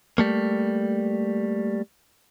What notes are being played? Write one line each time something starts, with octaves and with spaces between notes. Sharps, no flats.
G3 A3 A#3